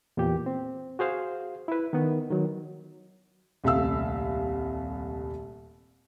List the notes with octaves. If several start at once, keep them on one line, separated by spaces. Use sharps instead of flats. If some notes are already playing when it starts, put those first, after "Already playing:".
E2 A#2 G4
C4
F#4 G#4 C5 F5
E4 B4
D#3 B3
D#3 F#3
D#1 C2 A3 E5 F5 E6